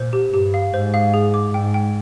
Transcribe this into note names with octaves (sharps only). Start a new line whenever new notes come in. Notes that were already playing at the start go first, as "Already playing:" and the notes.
Already playing: A#2 C5
G4
G2 G4
F5
G#2 C5
F5
G#4
D6
G#2 G5
G5